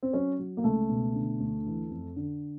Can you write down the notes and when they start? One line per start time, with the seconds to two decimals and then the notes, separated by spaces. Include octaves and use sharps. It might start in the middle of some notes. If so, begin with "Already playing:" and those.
0.03 C4
0.13 F#3 C#4
0.39 F#3
0.57 A#3
0.64 C#2 A3
0.89 B2
1.15 D3
1.40 D2
1.66 E3
1.91 F2
2.16 D3